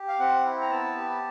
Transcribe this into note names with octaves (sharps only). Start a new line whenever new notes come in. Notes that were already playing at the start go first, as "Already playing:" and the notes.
Already playing: G4
F5
C4 F#5
E4
A#5
B3 A5
G4